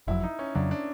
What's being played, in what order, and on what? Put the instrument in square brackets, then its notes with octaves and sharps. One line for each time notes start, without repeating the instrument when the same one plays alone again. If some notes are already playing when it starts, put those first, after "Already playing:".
[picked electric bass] F#1 F2 C#3 F#3 [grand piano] E4
[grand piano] D#4
C#4
[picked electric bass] F2 C#3 F#3 [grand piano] D4
[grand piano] D4